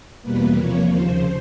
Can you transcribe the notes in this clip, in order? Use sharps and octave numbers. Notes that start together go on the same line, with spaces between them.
E2 B2 G3 A#3 B4
C3 F3 A#3 C#5
D#2 C#3 F3 C5